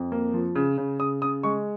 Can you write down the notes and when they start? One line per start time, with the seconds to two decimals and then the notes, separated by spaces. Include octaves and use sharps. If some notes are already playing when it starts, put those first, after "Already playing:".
Already playing: F2
0.12 A#3
0.33 F3
0.55 C#3
0.78 C#3
0.99 C#3 D#6
1.22 C#3 D#6
1.43 G#3 C#6